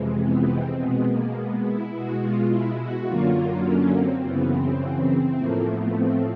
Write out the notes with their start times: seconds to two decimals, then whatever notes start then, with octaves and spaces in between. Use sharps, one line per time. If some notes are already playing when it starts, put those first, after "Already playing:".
Already playing: F2 C3 E3 G#3
0.22 B3
0.51 C4
0.79 B2 G#3 B3
1.08 A#3
1.36 B3
1.66 E4
1.94 B2 G#3 F#4
2.22 F4
2.51 E4
2.80 F#4
3.08 F#2 D3 F#3 A#3 F4
3.37 F4
3.66 C#4
3.95 C4
4.23 F#2 C#3 E3 B3
4.52 C4
5.37 A2 F3 A3 A#3
5.66 B3
5.95 C4